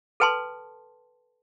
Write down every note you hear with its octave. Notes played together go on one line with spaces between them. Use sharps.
A4 B4 G5 A5 C6